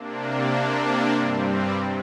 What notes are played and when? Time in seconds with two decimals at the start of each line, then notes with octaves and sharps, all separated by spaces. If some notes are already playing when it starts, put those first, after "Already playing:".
Already playing: C3 A#3 D4
0.52 C3 A#3 D4
1.12 G2 G3 C4
1.72 C3